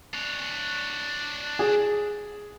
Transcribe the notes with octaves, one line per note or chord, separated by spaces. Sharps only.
D4 C#5
G#4